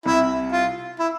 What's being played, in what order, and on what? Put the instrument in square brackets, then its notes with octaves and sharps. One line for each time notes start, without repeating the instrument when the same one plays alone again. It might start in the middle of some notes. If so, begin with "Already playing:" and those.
[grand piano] C2 C3 [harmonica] E4
[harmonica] F4
E4